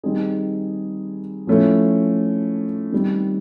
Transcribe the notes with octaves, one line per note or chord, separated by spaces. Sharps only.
D#3 G3 C4 D#4 G#4
F3 A3 C#4 E4
D#3 G3 C4